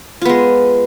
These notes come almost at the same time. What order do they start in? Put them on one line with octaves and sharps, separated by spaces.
F4 B3 G#3